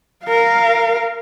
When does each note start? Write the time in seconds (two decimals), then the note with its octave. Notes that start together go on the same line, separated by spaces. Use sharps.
0.25 A#4 F5